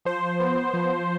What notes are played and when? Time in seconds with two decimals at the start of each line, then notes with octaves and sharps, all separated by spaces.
0.05 F3 C5
0.40 B3
0.74 F3